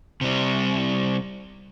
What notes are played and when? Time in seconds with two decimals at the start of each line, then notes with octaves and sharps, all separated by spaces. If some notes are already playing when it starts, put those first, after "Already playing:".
0.21 C3 G3